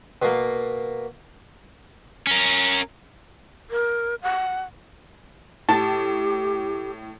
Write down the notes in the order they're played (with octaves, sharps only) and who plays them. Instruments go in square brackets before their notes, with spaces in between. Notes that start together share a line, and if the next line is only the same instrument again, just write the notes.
[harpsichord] B2 A#3
[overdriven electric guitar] C#4 A#4
[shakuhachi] A#4
F#5
[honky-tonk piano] A2 [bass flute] G4 [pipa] A5